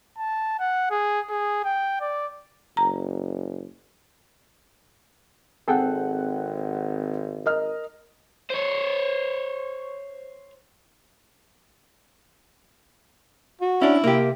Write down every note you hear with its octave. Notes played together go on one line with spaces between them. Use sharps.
A5
F#5
G#4
G#4
G5
D5
F#1 A#5
G#1 C4 G#4 A4 F#5 G5
A#4 D#5 F6
C5 C#5
F#4
C#4 D4 E4
C3 A#3 G4